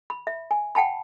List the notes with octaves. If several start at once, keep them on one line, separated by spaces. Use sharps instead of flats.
B5
E5
G#5
F#5 G5 A5 B5